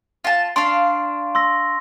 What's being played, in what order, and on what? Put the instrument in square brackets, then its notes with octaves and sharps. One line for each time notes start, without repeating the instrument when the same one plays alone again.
[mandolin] F4 A5
[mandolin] D4 F5 [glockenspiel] C6 C#6
[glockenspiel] C6 E6 A#6